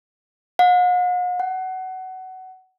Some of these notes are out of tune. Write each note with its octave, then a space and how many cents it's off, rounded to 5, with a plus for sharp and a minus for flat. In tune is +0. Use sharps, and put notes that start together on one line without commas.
F#5 -45
F#5 +20